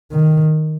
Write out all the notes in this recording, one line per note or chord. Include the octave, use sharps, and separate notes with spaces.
D#3